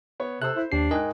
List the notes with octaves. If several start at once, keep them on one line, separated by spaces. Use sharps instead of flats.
B3 C#5
C3 A4 C5 E6 F#6
E4 C5
D#2 D4 G4 C7
G#2 A#4 D#5 G5 G#5 F#6